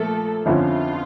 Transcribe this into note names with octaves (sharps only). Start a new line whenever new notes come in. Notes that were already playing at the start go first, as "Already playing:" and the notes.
Already playing: A#2 F3 A3 A#3 A4
G1 F2 D3 F3 C#4 F4